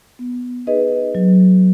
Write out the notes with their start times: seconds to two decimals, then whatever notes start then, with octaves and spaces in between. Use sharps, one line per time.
0.19 B3
0.67 D#4 G#4 B4 D#5
1.15 F#3